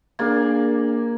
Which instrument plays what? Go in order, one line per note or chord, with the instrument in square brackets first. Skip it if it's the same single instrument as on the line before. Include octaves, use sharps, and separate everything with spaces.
[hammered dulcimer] A#3 D5 [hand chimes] D4 G#4 G#6